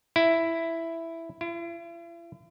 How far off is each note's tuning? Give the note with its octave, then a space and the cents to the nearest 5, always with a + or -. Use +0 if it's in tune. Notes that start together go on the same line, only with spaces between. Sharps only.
E4 +5
E4 +45